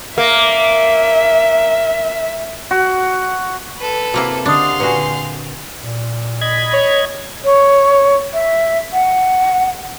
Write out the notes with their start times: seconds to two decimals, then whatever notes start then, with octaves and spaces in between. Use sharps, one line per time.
0.18 A#3 E5
2.71 F#4
3.78 A4 B4
4.14 C3 A#3 E4 F#4 F#5
4.45 D3 D4 G4 D#5 F5 C6 D#6
4.80 A#2 C4 F#4 B4 G#5 C#7
5.80 A#2
6.41 D#5 B5 G#6
6.73 C#5
7.45 C#5
8.33 E5
8.93 F#5